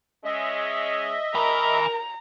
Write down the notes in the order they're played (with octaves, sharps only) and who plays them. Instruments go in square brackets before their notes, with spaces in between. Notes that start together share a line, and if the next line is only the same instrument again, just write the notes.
[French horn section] G#3 C#4 [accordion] D#5 E5
[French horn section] A#4 [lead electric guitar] G#5 B5 [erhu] A#5